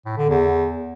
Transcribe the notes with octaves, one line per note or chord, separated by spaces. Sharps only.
A2
D3
E2